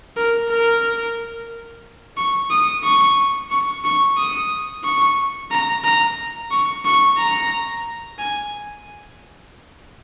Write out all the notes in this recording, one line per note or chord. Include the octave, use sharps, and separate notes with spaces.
A#4
A#4
C#6
D#6
C#6
C#6
C#6
D#6
C#6
A#5
A#5
C#6
C#6
A#5
G#5